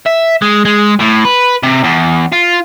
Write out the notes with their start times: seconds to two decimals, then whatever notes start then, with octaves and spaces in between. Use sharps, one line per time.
0.06 E5
0.42 G#3
0.65 G#3
1.00 A2
1.25 B4
1.63 C3
1.84 E2
2.32 F4